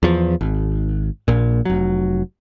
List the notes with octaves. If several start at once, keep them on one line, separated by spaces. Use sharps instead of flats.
E2 F3
G#1
A#1 A#2
F1 F#3